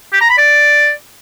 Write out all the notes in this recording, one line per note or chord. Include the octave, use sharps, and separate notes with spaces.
G4
A#5
B5
D5